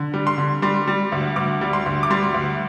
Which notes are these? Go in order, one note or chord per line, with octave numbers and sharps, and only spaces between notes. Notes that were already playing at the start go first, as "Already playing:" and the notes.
Already playing: D3
G3
C6
D3
G3 C6
G3
D2
D2 D6
G3
C6
D2
D6
G3 C6
D2